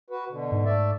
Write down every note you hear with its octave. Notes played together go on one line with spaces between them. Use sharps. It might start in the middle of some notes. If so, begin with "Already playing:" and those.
F#4 B4
B2 D3
G#2
A3 D5 E5